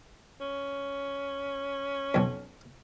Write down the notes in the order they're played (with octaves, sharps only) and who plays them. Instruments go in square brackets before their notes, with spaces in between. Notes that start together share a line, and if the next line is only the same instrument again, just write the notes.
[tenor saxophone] C#4
[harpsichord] B1 F2